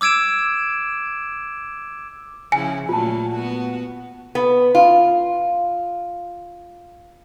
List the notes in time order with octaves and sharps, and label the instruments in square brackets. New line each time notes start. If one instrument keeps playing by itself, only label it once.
[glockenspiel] D6 E6 G#6 D7 E7
[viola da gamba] C#3 F3 E4 [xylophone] G#5
[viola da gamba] A#2 F#3 A3 [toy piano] F4 A5
[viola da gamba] B3 F#4
[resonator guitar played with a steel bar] B3
F4